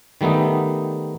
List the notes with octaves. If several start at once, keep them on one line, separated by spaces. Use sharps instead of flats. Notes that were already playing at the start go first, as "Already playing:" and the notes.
D#3 G3 A3 B3 D#4